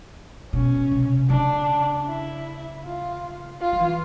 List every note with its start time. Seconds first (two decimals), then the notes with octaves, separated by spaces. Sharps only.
0.53 B2 C#4
0.91 C3
1.30 C#3 D4
2.07 E4
2.84 F4
3.61 F4
3.72 F3
3.79 E3